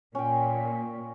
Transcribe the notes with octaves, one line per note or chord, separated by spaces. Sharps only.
A#2 C#4 G5